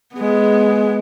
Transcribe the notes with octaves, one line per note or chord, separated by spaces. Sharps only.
G#3 B3